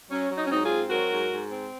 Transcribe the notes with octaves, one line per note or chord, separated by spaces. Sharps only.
F#3 C#4
F#3
D#4
C#4
G#2 C4 D#4
F4 G#4
C4
F#3 F#4 A#4
G#2
G#2
C4